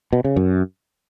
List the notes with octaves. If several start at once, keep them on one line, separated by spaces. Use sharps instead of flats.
B2
C#3
F#2